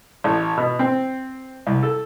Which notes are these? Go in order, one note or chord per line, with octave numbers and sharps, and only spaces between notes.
A1
B2
C4
C2
A4